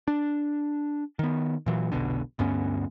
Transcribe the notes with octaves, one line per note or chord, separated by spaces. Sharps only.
D4
D#3 B3
A#2 E3 F#3
F1 B1 B2 D3
D2 G2 B3 C#4